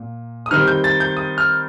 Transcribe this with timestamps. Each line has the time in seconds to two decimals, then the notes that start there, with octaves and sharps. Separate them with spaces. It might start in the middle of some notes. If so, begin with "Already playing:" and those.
Already playing: A#2
0.46 D#6
0.51 D#3 G3 C4 D#4 F6
0.67 G6
0.84 A6
1.00 G6
1.17 D#6
1.38 F6